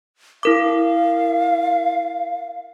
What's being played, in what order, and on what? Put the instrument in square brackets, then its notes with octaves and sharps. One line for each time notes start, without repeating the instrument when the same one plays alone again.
[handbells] E4 A#4 D6 [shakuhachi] F5